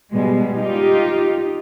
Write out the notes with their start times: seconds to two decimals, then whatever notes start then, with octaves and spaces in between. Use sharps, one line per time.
0.12 B2 G3 G#3
0.55 D#4 F4 G4